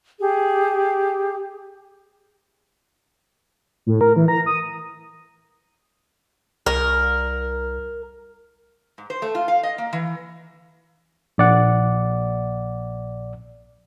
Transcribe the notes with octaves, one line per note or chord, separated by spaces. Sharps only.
G4 G#4
A2
A#4
E3
A#5
D#6
C2 A#4
G#2
C5
A3
F4
F5
D#5
A#3
E3
A#1 D5 F#5